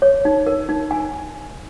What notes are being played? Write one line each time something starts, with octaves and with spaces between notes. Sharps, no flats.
C#5
D#4
A#4
D#4
G#5